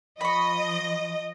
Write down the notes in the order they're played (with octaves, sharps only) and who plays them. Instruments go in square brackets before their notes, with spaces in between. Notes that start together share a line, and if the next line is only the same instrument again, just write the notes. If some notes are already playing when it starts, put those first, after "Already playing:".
[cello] F3 [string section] D#5 [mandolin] B5 C#6